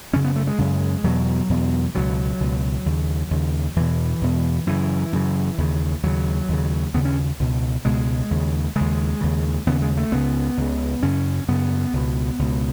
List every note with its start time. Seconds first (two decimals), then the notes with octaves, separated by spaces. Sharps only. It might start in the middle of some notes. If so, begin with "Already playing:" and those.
0.13 F#2 C#3 C#4
0.24 B3
0.36 A3
0.47 G#3
0.58 F#2 C#3
1.04 E2 B2 F#3
1.49 E2 B2
1.95 C#2 B2 F#3
2.40 C#2 B2
2.86 D#2 C#3
3.31 D#2 C#3
3.76 E2 B2 E3
4.21 E2 B2
4.67 F#2 C#3 E3
5.13 F#2 C#3
5.58 D#2 C#3
6.03 D#2 C#3 F#3
6.49 D#2 C#3
6.94 D#2 C#3 B3
7.05 C#4
7.40 C#2 B2
7.85 C#2 B2 G#3
8.31 D#2 C#3
8.76 D#2 C#3 G#3
9.21 D#2 C#3
9.67 D#2 C#3 B3
9.82 G#3
9.97 A3
10.12 C#2 C#3 B3
10.57 C#2 C#3
11.03 F#2 C#3 C#4
11.48 F#2 C#3 B3
11.93 C#2 B2
12.39 C#2 B2